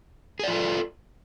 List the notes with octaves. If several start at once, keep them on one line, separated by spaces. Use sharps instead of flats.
F4 G#4 A4 D5